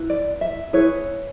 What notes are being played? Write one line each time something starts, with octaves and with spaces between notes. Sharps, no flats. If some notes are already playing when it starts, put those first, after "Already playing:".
Already playing: E4 B4
D5
E5
E4 G#4 B4 C#5